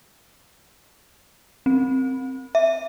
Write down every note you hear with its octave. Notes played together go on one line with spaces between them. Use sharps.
C4
E5